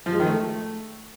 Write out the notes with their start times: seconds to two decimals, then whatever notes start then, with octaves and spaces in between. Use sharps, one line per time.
0.06 F3
0.13 G#3
0.20 D#3
0.27 A3